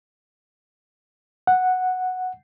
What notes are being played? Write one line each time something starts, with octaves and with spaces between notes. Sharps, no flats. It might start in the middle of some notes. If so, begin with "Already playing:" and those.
F#5